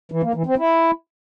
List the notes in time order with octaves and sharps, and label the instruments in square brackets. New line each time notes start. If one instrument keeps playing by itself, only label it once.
[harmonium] E3
A#3
E3
C4
E4